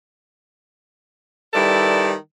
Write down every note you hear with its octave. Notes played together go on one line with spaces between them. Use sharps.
D#3 G3 E4 A4 B4 D5